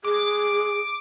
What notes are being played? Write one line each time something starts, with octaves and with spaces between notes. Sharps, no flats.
G#4 D6